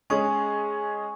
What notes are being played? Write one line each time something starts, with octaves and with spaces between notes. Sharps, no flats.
G#3 C#4 G#4 G#5 C#6